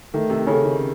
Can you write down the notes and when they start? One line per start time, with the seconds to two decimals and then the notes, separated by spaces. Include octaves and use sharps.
0.14 D#3 A3
0.30 C3
0.47 C#3 C#4 A4
0.64 D#3